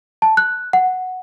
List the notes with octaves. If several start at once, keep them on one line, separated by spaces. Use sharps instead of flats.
A5
F#6
F#5